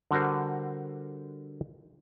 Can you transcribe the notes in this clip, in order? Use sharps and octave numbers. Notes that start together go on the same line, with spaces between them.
D3 G3 F#4 A#4 C5